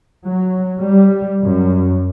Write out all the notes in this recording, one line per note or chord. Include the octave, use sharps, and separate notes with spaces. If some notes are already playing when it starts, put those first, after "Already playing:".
F#3
G3
F#2